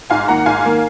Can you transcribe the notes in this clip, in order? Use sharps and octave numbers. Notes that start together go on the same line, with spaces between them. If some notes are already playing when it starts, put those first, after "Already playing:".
G#2 F5 G#5
D#3 A#3 F#5 A#5
G#2 F5 G#5
D#3 A#3